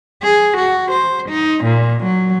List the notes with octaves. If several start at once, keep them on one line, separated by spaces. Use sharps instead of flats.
G#4
F#4
C5
D#4
A#2
F#3